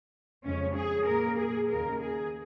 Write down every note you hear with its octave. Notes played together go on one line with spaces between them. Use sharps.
F2 C#3 G#3 C#4
G#4
A#2 A#3 A#4
G#4
D#2 C#3 A#3 A#4
G#4